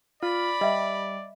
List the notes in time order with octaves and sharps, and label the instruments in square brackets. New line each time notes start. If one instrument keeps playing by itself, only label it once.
[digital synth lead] F4 [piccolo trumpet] D5 [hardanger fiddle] B5
[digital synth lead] G3 [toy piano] D#5 E5